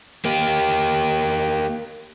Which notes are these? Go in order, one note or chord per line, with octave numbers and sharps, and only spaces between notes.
A#3 G4